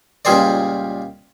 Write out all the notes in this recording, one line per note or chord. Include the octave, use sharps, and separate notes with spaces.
C#2 A#2 G3 G#4 C5 D5